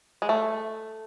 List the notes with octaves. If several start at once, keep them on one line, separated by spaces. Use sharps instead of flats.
G#3
A3